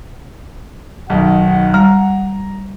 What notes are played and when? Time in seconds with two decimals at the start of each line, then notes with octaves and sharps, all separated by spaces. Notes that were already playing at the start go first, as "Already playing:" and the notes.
1.10 B1 D#3 F#5
1.74 G3 A#5